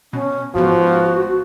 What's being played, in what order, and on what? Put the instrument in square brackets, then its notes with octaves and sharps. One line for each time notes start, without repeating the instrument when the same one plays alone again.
[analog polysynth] B2 [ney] C#4
[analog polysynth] A1 G#2 B3 [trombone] F3 [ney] F#4